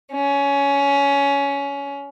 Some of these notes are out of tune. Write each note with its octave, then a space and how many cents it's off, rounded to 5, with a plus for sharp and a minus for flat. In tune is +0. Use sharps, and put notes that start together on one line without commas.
C#4 +20